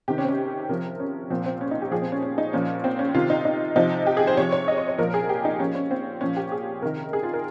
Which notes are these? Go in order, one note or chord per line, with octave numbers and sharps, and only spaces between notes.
C3 D#3 G4
C#4
C4
C#4
C3 F3 A#4
C#4
A#2 F3 C4
C4
C#4
D#4
G4
A#2 F3 G#4
C4
C#4
C#4
D#4
A#2 F3 C#4
C4
C#4
C3 D#3 F4
D#4
D#4
C3 F3 D#4
G4
G#4
C5
C3 F3 C#5
C#5
D#5
C#5
C#5
A#2 F3 A#4
G#4
G4
D#4
A#2 F3 C#4
C#4
C4
A#2 F3 C#4
G4
G#4
C3 D#3 A#4
G#4
F4
A#4